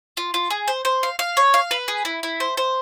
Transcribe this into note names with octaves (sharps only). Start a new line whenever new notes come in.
F4
F4
G#4
C5
C5
F5
F5
C#5
F5
B4
G#4
E4
E4
C5
C5